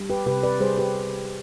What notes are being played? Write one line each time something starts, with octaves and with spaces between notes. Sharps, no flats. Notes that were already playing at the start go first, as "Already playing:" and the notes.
Already playing: G3
G4 B4
C3 G4 B4
B4 D5
G3 G#4 C5
G4 B4